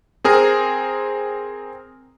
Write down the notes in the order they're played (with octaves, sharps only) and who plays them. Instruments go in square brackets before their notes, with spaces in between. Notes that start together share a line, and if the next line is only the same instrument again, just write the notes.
[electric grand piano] C4 G#4 A#4